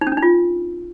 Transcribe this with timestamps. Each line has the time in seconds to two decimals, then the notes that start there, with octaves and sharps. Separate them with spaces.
0.01 D#4
0.07 C#4
0.12 D4
0.17 D#4
0.22 F4